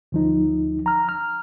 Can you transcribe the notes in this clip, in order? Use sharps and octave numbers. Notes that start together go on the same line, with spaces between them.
D2 F3 D#4
A#5 F6
F6